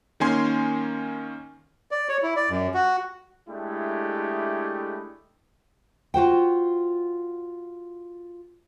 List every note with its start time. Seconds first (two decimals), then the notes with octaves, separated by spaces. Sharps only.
0.20 D#3 A#3 C#4 A#4 G#5 C6
1.91 D5
2.09 C#5
2.23 E4
2.36 D5
2.50 F#2
2.74 F#4
3.49 G#3 A3 D4 E4 G4
6.14 F4 F#4 C5 G5